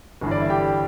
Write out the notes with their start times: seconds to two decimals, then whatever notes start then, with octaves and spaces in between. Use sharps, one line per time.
0.21 G1 G2 E3
0.31 D5
0.41 E5
0.50 G4 G5